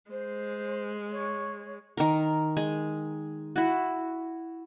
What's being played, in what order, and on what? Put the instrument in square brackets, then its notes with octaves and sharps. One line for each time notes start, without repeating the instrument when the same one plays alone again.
[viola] G#3 [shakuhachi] C5
[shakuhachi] C#5
[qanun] D#3 A#4
G#3 G#5
E4 F#4